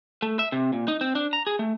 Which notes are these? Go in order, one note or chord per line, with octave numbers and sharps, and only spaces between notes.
A3
E5
C3
A#2
D#4
C4
D4
A#5
G#4
A3